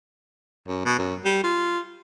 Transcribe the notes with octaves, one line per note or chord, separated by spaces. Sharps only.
F#2
B2
F#2
G3
F4